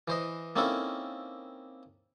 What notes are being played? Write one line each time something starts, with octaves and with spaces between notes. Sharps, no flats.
E3 C5 D#5
A#3 C4 C#4 D#4 E4 A4